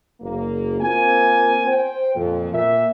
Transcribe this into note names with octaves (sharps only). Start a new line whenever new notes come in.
F#1 A#3
A#3 C4 F4 G#5
C5 G5
F2 A#2 F3
A#2 E5